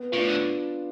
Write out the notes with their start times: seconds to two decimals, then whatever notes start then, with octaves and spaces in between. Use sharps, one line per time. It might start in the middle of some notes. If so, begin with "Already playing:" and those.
Already playing: B3
0.12 A2 D4 F4
0.28 D3